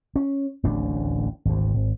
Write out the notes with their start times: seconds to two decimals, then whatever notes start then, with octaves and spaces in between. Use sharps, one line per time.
0.16 C#4
0.63 D1 A1 D#2 D4
1.45 G#1 D2
1.74 G#1